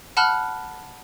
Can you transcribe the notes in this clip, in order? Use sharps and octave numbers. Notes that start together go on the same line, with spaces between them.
F#5 A5 B5 F6 F#6 G7